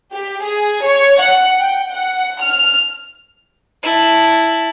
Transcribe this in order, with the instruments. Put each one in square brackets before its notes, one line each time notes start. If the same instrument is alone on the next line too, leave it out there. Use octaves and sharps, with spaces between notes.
[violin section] G4
G#4
C#5
F#5
G5
F#5
F6
[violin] E4 A5